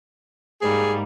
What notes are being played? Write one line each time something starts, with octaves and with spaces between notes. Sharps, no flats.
G#2 G3 A#3 G#4